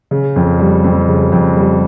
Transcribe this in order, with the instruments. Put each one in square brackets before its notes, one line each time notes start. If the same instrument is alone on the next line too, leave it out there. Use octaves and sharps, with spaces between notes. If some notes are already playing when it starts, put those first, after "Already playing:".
[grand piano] C#3
F2
G3
F2
C#3
F2
G3